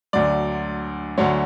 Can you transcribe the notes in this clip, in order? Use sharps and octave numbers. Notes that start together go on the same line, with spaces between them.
D2 D3 F#3 D5
D2 D3 F#3 C#5